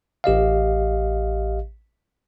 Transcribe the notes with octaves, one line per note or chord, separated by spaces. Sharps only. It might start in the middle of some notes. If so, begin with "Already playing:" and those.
A1 G4 D#5 F5